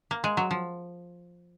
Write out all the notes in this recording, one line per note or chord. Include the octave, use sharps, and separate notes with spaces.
A#3
G#3
F#3
F3